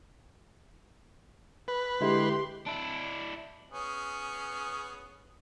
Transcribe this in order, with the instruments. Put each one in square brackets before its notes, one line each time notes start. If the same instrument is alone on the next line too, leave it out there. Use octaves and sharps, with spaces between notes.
[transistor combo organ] B4
[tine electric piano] D3 G#3 E4 [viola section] G4 C6
[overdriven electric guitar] D4 E4
[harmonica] B3 C#4 G#4